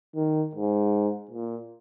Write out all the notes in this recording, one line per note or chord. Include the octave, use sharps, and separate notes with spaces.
D#3
G#2
A#2